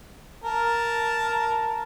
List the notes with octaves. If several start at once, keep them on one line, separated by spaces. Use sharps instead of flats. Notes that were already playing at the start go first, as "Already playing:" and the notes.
A#4 A5